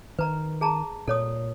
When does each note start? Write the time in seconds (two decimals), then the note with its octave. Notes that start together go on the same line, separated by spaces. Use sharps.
0.19 D#3 B4 A#5
0.61 G#4 A5 A#5
1.08 A#2 A4 C#5 D#6